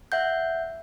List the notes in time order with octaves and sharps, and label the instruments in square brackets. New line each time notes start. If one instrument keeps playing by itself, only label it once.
[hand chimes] E5 F#5 G6